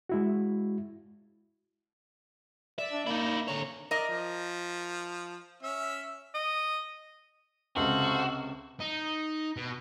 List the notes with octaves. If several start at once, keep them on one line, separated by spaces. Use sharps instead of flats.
G#3 E4 F#4
D5 E5
D4
A#3 D#4 E4
D3 C#5 A#5
A#4 D5 D#5
F3
C#4 E5
D#5
C#2 C3 F#4 A4 C5 F5
D#4
B2